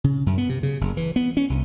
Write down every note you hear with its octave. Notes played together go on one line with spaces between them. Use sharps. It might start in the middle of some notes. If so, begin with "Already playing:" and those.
C#3
F#2
B3
C3
C#3
F#1
E3
B3
C#4
C2